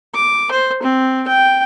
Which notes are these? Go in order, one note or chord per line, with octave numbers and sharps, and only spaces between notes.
D6
C5
C4
G5